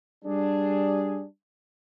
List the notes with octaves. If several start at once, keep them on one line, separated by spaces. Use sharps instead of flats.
G3 D4 G#4